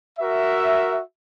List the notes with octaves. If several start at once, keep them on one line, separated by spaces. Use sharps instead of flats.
F#4 A#4 E5